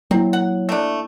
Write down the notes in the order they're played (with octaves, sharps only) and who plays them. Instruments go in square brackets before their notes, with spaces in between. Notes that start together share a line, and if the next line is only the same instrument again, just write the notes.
[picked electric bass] F#3 [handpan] A#3 E4 [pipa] C4
[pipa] F#5
A3 D4